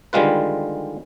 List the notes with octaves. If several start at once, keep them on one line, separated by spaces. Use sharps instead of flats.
D3 D#3 G3 G#3 F4 B4